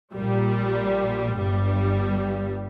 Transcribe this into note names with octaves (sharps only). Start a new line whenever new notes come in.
A#1 A#2 G3
G1 G2 G3